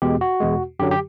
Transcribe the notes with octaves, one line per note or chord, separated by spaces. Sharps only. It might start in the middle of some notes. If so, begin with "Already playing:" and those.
E2 B2 G#3 G4
F#4
E2 B2 G#3
F#2 D3 F#3 G4
G4